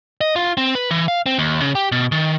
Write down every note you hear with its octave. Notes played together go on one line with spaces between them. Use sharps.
D#5
F4
C4
B4
E3
F5
C4
D#2
C#3
G4
B2
D#3